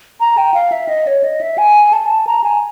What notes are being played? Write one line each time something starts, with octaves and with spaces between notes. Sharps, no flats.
A#5
G5
F5
E5
D#5
C#5
D#5
E5
G#5
A5
A#5
G#5